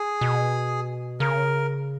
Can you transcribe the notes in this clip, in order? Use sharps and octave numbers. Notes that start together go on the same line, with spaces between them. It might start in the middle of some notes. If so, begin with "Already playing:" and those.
Already playing: G#4
B2
C#3 A#4